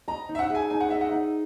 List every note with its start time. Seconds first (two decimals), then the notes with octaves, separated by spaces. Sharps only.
0.08 D#5 A#5
0.29 D#4
0.35 E5
0.39 F#5
0.50 G#4 G#5
0.70 D#4 G#5
0.80 F#5
0.90 D#5 E5
1.01 F#5
1.12 D#4